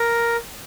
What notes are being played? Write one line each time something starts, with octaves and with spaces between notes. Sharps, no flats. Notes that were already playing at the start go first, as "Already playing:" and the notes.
Already playing: A#4